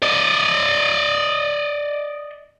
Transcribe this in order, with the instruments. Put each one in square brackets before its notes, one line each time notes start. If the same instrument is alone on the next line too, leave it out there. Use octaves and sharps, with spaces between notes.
[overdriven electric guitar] D5 D#5